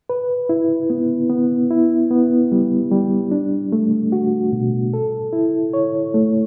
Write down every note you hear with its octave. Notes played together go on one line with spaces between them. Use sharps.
B4
E4
B3
B3
E4
B3
G3
G3
D4
A3
F#4
B2
A4
E4
C#5
A3